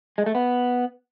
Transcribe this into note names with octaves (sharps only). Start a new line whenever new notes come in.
G#3
A3
B3